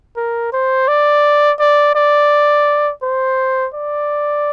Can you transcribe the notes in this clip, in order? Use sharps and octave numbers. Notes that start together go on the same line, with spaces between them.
A#4
C5
D5
D5
D5
C5
D5